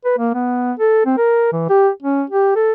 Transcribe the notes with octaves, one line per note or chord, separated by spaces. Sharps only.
B4
A#3
B3
A4
C4
A#4
E3
G4
C#4
G4
A4